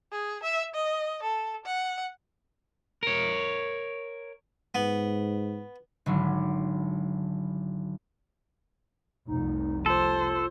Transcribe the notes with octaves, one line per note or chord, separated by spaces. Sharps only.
G#4
E5
D#5
A4
F#5
A#4 C#5
G#2 B3
G#1 D3 F#3 E4
F1 C2 D#4
F4 A4 C5